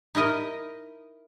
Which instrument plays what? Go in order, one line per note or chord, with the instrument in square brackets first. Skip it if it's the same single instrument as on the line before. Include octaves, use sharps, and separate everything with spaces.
[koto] D#4 E4 A#4 D#5